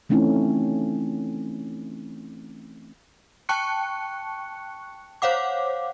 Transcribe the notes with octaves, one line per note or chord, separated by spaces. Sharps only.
E3 A3 C4 C#4 D#4 E4
G5 A5 C#6 F#6 C#7
C5 C#5 F5 F#5 D6